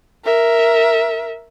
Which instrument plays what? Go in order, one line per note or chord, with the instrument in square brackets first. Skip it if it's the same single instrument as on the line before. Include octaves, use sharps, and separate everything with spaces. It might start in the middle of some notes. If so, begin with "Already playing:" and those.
[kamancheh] A#4 E5